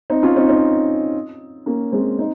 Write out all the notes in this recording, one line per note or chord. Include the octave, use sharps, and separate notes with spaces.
C4 D#4
C#4 F4
C4 D#4
C4 D#4
A#3 C#4
G#3 C4
C4 D#4